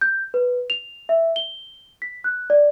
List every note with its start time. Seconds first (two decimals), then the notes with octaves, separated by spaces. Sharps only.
0.01 G6
0.34 B4
0.70 F7
1.09 E5
1.36 G7
2.02 B6
2.24 F#6
2.50 D5